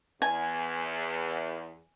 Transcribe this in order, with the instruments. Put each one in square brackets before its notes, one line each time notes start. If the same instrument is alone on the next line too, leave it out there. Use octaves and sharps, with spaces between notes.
[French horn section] E2 [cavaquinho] G#5